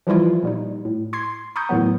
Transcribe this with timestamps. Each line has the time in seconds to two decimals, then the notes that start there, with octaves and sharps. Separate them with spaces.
0.07 E3 F3 G3 E4 F4
0.43 A#2 G3 D#4
0.85 A2
1.13 C6 G#6 C7
1.56 A#5 B5 C#6 D#6 G6
1.69 E2 A2 D#3 F#3 B3